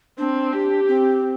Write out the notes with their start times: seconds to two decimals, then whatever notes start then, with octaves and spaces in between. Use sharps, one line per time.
0.18 C4 D4
0.53 G4
0.88 C4